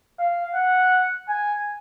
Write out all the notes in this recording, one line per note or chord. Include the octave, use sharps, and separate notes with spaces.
F5
F#5
G#5